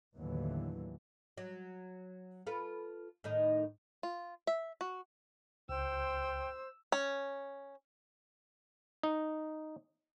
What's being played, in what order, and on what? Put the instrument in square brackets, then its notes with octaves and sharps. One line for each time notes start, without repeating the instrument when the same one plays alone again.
[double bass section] D#2 A2 D3 E3 F#3
[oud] F#3
F4 A4 B4
A2 D#3 D#4
[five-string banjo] F4
E5
F#4
[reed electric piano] C#2 [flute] C5 [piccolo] G5 [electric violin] E6
[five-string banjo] C#4
[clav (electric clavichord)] D#4